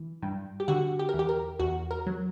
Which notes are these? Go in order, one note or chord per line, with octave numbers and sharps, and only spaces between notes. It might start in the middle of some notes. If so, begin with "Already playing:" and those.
Already playing: E3
G2
G4
D3 F#4
G4
E2 A#4
G4
A#4
E2 F#4
A#4
F#3